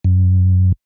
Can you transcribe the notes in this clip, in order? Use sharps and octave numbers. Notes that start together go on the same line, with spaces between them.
F#2